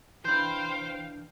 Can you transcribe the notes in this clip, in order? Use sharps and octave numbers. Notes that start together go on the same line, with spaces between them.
E3 D4 C5 F5 G5 B5 G6